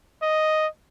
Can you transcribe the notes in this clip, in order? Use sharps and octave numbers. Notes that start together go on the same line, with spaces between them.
D#5